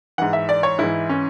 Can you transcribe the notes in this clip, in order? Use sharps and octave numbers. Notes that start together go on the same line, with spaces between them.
G#2 E3 F#5
E5
D5
C#5
G#2 E3 E4
C#4